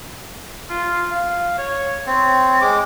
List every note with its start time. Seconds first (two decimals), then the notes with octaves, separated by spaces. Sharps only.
0.70 F4
1.11 F5
1.58 C#5
2.06 C4 C#5
2.61 G#3 D6